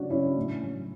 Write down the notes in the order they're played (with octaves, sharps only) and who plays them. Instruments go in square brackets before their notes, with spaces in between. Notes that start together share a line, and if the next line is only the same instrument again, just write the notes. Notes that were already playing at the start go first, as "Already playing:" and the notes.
Already playing: [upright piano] C#3 F#3 D4 F#4
C#3 C#4 E4
A2
F#3